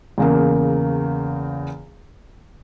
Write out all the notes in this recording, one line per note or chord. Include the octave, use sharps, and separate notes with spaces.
E2 C#3 A#3